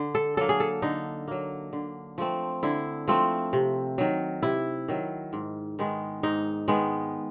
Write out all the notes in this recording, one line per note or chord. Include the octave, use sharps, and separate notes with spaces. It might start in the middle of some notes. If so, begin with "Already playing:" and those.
Already playing: D3
A4
F#3 A#3 A4
G#4
A4
D3 D#4
F#3 A#3
D3
F3 A3 C4
D3 E4
F3 A3 C4
C3
D#3 F#3
C3 E4
D#3 F#3
G#2
D#3 G#3 B3
G#2 D#4
D#3 G#3 B3